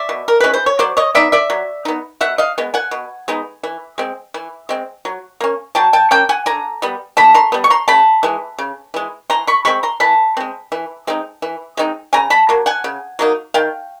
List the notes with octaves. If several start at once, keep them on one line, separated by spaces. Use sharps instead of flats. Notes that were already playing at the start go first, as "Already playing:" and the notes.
Already playing: D5 E5
B2
A#4
G#3 C#4 E4 B4
C5
C#5
F#3 C5 D5
C#5 D#5
B3 D#4 D5 E5
D5 E5
F#3
B3 D#4
B2 E5 F#5
D#5 F5
G#3 B3
F#5 G#5
B2
G#3 B3 D#4
E3
G#3 C4
E3
G#3 C4
F#3
A#3 C#4
F#3 G5 A5
G5 A5
A#3 C#4 G5
F#5 G#5
D3 G#5 A#5
G3 B3
D3 A5 B5
A#5 C6
G3 B3
C#6
A#5 C6
C#3 A5 B5
E3 G#3
C#3
E3 G#3
E3 A#5 C6
B5 C#6
G#3 C4 B5 C#6
A#5 C6
E3 A5 B5
G#3 C4
E3
G#3 C4 D#4
E3
G#3 C4 D#4
C#3 G#5 A#5
A5 B5
F#3 A#3
F#5 G#5
C#3
F#3 A#3 D#4
D#3 F5 G5